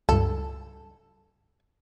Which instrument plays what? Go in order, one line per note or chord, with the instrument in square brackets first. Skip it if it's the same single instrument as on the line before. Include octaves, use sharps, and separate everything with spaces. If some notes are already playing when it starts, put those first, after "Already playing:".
[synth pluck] C#2 G2 [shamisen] A4